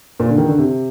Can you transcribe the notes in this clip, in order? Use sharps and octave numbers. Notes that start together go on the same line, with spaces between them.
A#2
D3
D#3
D3
C3